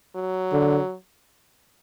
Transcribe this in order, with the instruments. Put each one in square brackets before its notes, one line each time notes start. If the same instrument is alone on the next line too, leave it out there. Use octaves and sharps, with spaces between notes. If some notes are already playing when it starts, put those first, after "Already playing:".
[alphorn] F#3
[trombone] D3